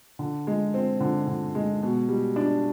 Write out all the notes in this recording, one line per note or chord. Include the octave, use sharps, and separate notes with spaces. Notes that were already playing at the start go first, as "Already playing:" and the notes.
D3
G#3
C4
D3
D3
G#3
B2
G3
D4